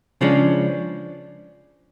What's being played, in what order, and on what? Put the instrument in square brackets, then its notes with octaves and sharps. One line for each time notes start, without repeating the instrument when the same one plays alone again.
[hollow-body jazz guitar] C#3 F3 G#3 C#4 D4